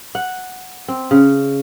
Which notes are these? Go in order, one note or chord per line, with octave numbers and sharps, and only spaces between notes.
F#5
C4
C#3